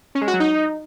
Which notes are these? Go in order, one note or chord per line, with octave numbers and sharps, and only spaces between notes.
C#4
G#3
F#4
F#3
D#4